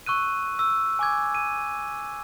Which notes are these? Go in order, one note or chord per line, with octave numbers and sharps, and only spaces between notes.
C#6 E6 F#6 D#7
E6
G#5 D6 G#6
D#7